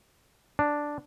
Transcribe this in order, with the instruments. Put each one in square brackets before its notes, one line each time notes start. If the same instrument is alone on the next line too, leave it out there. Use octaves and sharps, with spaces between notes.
[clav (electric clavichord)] D4